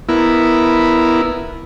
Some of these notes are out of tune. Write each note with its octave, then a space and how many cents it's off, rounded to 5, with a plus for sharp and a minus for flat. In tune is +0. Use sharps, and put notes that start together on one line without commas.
B3 +0 E4 +0 A#4 +0